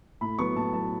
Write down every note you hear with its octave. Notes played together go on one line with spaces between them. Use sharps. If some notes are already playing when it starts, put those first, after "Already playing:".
A2 B5
F#3 B3 C#6
A2 A5
F#3 B3 A5